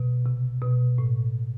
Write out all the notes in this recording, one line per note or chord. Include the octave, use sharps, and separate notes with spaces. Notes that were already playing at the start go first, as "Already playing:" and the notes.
Already playing: B2
C3
B2
A2